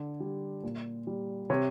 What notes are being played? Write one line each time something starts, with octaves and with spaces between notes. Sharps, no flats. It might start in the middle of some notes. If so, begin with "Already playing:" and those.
Already playing: D3
G3
A#2
G3
C3 C#5